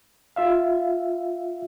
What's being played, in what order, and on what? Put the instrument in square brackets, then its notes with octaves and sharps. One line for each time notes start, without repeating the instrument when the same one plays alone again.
[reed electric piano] F4 E5 F5